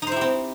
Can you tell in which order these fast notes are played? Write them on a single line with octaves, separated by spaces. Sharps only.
D#4 C5 E4 G4 C4